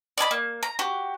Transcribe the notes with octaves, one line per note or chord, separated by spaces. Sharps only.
D5 D#5 G#5 B5
A#3
A#5
F#4 G4